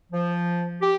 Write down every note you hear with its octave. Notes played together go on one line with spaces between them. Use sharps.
F3
G4